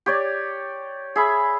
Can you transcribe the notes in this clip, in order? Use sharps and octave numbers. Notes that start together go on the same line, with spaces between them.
G4 C#5 D5
G#4 E5 B5